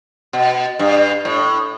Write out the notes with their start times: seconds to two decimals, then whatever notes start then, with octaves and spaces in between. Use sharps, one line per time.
0.33 B2
0.79 G2
1.25 A2